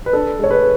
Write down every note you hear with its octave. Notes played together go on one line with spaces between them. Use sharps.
B4
D4 A4
G#3 C#5
B4